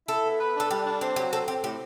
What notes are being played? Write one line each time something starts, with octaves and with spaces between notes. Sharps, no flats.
E4 A4
B3
B4
D4 A4
G3 G4
D4
C4 G4
F#3 G4
C4 A4
C4 G4
A2 G4